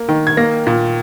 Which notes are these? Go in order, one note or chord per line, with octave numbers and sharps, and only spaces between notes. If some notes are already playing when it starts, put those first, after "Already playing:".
Already playing: A#3
D#3
G#6
A#3 A#6
A#2